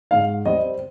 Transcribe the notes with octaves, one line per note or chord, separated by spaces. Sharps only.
G#2 F5
G3 C4 D#5